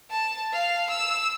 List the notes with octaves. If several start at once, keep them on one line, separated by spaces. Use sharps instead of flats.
A5
F5
E6